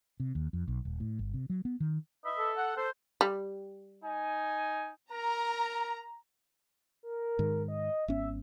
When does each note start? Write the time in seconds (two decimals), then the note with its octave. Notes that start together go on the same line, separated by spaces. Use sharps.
0.20 C3
0.35 D#2
0.53 F2
0.68 B1
0.85 D#1
1.00 A2
1.19 G1
1.34 C3
1.50 F#3
1.65 B3
1.80 D#3
2.25 B4 D#5 E5
2.39 A4
2.57 F#5
2.77 A4 C5
3.21 G3
4.05 D#4 G#5
5.12 A#4 A#5
7.03 A#4
7.39 G#2 D#3
7.68 D#5
8.08 G#1 B3 C#4 E5